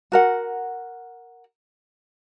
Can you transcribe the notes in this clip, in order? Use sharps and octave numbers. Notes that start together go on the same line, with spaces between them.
F#4 A#4 F#5